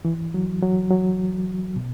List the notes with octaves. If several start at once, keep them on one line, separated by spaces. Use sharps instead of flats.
E3
F#3
F#3
F#3
B2